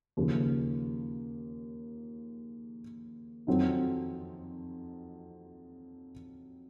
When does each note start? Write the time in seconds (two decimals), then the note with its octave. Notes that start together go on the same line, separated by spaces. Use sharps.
0.17 D#2 C#3 F3
3.47 F2 D#3 F#3 C4 D#4